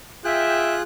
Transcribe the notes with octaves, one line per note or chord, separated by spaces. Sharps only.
F4 G#4 E5 G5 F#6